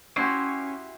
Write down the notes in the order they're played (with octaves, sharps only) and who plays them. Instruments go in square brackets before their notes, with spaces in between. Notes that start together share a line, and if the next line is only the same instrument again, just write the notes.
[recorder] C#4 [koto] E4 F#4 G4 [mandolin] C6